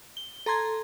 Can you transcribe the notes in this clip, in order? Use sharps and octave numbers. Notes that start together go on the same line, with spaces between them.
G7
A4 A#5 C6 G#6